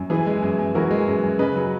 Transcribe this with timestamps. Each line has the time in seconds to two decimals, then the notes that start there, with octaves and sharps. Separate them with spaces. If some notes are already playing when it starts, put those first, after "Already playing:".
Already playing: F#2
0.10 E3 E4 G#4
0.26 G#3
0.43 F#2
0.59 F#2
0.75 E3 F#4 A#4
0.91 G#3
1.07 F#2
1.24 F#2
1.39 C#3 B4 D#5
1.56 F#3